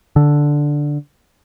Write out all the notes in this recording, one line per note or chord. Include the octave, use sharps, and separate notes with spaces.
D3